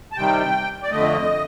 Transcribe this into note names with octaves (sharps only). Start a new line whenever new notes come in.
A5
C3 D#3 G3 G5
D5
F2 D3 A3 D#5